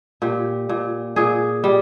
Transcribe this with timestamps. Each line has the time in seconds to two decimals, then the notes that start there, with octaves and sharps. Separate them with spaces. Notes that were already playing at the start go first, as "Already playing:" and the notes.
0.22 A#2 G4
0.69 A#2
1.16 A#2 G#4
1.64 G3